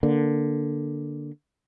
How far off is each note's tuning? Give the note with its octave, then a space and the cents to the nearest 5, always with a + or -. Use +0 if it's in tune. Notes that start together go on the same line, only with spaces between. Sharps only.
D3 +0 A#3 +10